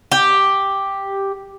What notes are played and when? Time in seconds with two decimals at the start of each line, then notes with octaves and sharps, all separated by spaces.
0.12 G4